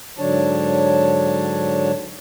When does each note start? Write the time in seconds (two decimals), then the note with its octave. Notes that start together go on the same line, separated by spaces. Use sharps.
0.18 G#2 D3 F#3 D4 C#5 A5